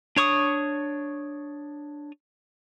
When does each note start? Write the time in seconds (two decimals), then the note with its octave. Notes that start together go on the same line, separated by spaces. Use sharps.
0.16 D4 C#5 C#6 D#6